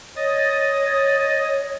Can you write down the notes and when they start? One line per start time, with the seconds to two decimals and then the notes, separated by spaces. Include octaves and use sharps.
0.16 C#5 D#5 D#6 A6